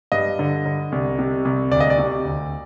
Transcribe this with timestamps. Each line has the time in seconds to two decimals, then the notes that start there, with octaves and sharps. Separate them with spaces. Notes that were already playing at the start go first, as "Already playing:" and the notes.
0.12 G2 D#5
0.39 D3
0.66 D3
0.92 C2
1.19 C3
1.45 C2
1.71 D2 D5
1.80 D#5
1.90 D5
1.99 C3
2.25 D2